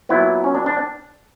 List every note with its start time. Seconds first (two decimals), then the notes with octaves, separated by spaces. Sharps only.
0.09 A#2 F#3 B3 E4
0.44 C#4
0.55 D4
0.66 D4